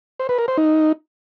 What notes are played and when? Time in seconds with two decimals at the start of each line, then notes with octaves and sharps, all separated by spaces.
0.20 C5
0.29 B4
0.39 A#4
0.48 C5
0.58 D#4